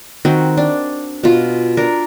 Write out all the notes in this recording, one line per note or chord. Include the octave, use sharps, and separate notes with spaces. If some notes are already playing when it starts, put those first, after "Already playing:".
D#3 C4 F#4
D4
B2 F4
D4 A#4